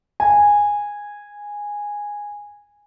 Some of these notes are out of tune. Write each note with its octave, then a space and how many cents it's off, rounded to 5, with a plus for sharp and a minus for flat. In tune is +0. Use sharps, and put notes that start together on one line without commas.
G#5 -10